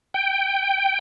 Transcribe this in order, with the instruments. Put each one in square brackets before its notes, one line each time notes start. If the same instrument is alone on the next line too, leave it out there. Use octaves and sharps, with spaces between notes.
[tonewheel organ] G5